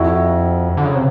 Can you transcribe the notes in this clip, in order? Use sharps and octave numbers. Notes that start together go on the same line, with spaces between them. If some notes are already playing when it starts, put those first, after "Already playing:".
Already playing: F2 E4 F#4
D3
C#3
C3